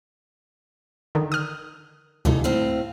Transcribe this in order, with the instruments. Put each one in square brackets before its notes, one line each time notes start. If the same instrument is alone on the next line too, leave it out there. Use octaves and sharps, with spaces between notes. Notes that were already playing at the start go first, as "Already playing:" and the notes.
[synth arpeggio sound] D3 D#3
D#6 F6
[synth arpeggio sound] D2 G2 C3 [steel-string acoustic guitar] E3 D#4 A4
[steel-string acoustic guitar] A2 C4 F5